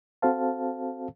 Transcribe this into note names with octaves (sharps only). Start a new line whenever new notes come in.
C4 F#4 A4 C5 F5 A5